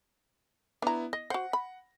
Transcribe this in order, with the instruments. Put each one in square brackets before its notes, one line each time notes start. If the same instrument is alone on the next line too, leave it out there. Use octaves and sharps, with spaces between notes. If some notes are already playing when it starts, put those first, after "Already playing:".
[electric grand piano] B3 E4 [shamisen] D4 A#5
[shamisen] D#5 [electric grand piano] A#6
[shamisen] F#4 C5 [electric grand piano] F#5
[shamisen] B5